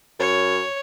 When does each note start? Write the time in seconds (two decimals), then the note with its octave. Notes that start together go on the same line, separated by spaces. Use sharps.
0.19 F#2 C#5